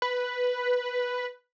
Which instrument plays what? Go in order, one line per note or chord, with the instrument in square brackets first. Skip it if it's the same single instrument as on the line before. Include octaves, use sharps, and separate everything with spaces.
[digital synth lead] B4